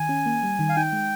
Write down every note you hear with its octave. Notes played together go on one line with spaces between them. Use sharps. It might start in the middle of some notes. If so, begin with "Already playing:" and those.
Already playing: D#3 G#5
C#4
A#3
G3
D#3
F5
D#4 G5
G#3